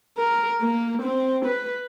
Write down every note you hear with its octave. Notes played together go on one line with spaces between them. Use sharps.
A#4
A#3
C4
B4